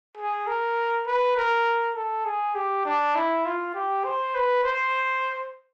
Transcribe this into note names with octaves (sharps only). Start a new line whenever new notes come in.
G#4
A#4
B4
A#4
A4
G#4
G4
D4
E4
F4
G4
C5
B4
C5